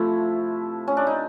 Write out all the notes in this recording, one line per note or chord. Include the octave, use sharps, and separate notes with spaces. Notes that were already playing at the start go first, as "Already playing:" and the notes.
Already playing: C3 F3 A3 E4
C#4
D4
D#4